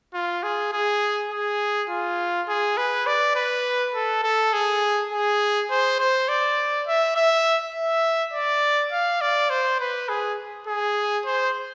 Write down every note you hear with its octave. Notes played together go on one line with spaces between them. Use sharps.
F4
G#4
G#4
G#4
F4
G#4
B4
D5
B4
A4
A4
G#4
G#4
C5
C5
D5
E5
E5
E5
D5
F5
D5
C5
B4
G#4
G#4
C5